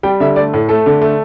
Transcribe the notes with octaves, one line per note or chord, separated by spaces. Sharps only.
G3 G5
D3 E5
A3 D5
A2
A3 A4
D3
A3